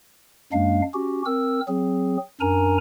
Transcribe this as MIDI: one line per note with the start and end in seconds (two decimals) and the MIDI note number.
0.52 0.82 42
0.52 0.82 56
0.52 0.82 58
0.52 0.82 62
0.52 0.82 77
0.94 1.22 61
0.94 1.22 66
0.94 1.22 67
1.26 1.61 60
1.26 1.61 70
1.26 1.61 88
1.68 2.17 54
1.68 2.17 60
1.68 2.17 68
2.41 2.78 42
2.41 2.78 62
2.41 2.78 70
2.41 2.78 80
2.41 2.78 82